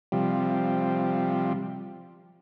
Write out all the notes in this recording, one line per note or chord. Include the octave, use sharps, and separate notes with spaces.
C3 F3 G3